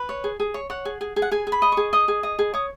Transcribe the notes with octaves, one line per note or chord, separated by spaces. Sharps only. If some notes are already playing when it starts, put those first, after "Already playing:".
Already playing: B4
C#5
G#4
G#4
C#5
C#5 F#5
G#4
G#4
G#4
F#5
G#4 G#5
G#4
B5
D#5
C#6
G#4
D#5 D#6
G#4
D#5
G#4
C#5 D#6